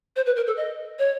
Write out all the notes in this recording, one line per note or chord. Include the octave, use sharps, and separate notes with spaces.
C5
B4
A#4
A4
D#5
C#5